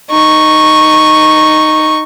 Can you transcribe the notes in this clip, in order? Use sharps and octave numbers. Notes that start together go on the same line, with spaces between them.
D#4 C#6